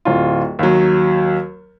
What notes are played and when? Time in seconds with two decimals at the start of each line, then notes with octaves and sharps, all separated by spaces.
0.05 D1 F4
0.59 D#2 F#3